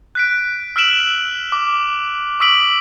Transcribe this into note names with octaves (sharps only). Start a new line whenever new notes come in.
F#6 B6 D7
E6 F6 B6 D7 E7 F#7
D6
C#6 D#6 E6 B6 D7 F#7